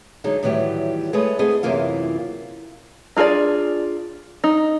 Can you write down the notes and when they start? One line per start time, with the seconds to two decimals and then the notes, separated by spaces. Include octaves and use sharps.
0.24 D3 F#3 G#3 D#4
0.43 A2 D#3 E3 F#3 G3 G4
1.13 G#3 A3 G#4 B4 C#5 D#5
1.39 A3 B3 C4 G#4 D#5
1.63 F#2 C3 E3 A#3 F4
3.17 D4 F4 G#4 A#4 D5
4.44 D#4